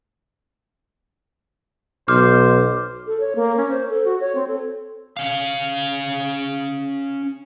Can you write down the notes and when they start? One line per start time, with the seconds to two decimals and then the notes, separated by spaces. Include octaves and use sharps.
2.08 B1 C5 D6 F6
3.07 A4
3.20 C#5
3.36 A#3
3.57 C#4
3.70 C5
3.89 A4
4.05 F#4
4.21 C#5
4.35 C4
4.48 A4
5.17 C#4 F5